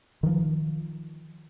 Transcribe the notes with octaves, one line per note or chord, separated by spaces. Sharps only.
D#3 F3